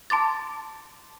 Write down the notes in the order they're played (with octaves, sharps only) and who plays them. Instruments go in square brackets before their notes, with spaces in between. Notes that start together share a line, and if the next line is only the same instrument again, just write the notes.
[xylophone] A5 C6 D6 A6